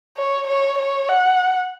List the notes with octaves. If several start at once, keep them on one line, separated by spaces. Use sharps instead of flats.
C#5
C#5
C#5
F#5